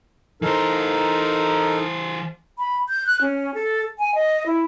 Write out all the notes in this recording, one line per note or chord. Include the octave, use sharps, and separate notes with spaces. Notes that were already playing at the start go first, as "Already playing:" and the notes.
E3 D#4 A4 A#4 C5
B5
G6
F#6
C#4
A4
G#5
D#5
E4